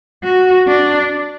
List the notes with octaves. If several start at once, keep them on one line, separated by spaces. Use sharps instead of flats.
F#4
D4